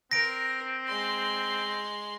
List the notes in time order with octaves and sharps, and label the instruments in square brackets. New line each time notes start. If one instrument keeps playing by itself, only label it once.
[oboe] C4 [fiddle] A#4 [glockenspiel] A#6 D7
[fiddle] G#3 C6